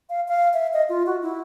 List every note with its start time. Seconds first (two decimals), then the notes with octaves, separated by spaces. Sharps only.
0.10 F5
0.28 F5
0.53 E5
0.73 D#5
0.89 F4
1.06 F#4
1.22 E4